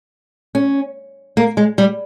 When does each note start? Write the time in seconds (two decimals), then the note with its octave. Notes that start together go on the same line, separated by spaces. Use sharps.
0.55 C#4
1.37 A#3
1.57 G#3
1.78 G3